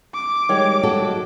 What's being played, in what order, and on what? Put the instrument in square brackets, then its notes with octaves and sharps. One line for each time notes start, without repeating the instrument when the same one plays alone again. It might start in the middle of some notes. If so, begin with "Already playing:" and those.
[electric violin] D6
[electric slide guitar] D#3 G3 G#3 [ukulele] C#5 G5
[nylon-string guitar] F#3 F#4 A4